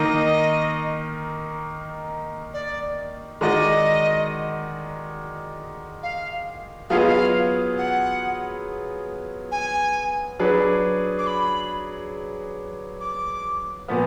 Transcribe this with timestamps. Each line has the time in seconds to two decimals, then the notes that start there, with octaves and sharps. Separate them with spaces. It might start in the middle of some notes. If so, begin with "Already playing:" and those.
Already playing: D#3 A#3 D#4 D#5
2.54 D5
3.41 D#3 G#3 D#4 F#4 D5 D#5
6.03 F5
6.90 F#3 B3 F4 G#4 F5
6.98 D#5
7.05 F5
7.78 F#5
9.52 G#5
10.40 F#3 D4 G#4 B4
11.19 D6
11.27 B5
13.01 D6
13.88 A#2 F3 B3